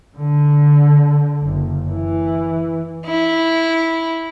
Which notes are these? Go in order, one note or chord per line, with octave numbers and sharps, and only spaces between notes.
D3
F#1
E3
E4